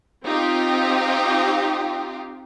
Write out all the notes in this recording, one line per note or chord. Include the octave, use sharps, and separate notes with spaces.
C4 D#4 F4 G4